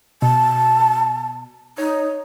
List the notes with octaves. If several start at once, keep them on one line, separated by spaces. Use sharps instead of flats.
B2 A5
D#4 C#5